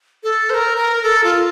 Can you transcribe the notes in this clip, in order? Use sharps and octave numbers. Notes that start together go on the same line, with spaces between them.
A4
C5
A#4
A#4
A4
F4